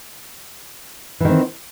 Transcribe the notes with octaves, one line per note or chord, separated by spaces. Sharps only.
D#3 E3 C4